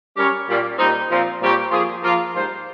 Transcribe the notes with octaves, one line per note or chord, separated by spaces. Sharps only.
G3 C#4 G4 A#4 C#5
A#2 G3 A#3
A#2 G3 C4 D#4
A#2 F3 C4
A#2 G3 C4 G4 C#5
F3 A#3 F4 G#4
F3 A#3 F4
G#2 G3 A#3 F4 C5